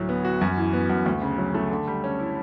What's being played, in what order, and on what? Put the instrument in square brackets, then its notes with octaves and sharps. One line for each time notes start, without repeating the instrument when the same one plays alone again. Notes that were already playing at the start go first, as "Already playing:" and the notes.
Already playing: [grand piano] D2 A2 F#3
B3
F#4
F#2
E3
B3
F#2
D2
C#3
F#3
A3
D3
G3
C#4
E4